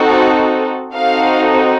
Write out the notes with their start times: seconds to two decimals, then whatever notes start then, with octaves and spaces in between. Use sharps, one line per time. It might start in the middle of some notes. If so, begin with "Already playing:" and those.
Already playing: C4 D#4 F#4 A4
0.93 C4 D#4 F#4 A4 F5